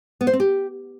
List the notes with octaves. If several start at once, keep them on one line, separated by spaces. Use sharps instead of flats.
B3
C5
C4
G4